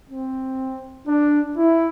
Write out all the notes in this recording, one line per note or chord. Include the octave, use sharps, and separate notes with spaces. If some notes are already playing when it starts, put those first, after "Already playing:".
C4
D4
E4